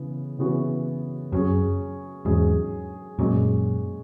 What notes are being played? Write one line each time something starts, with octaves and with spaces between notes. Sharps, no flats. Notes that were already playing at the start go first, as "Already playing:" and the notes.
Already playing: C#3 E3 B3
C#3 E3 B3 F#4
F#2 F#3 C#4 G#4
E2 G#2 F#3 C#4 G#4
F#2 A#2 G#3 C#4 F#4